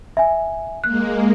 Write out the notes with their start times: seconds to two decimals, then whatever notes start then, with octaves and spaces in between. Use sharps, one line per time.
0.17 E5 G#5
0.84 G#3 A#3 F#6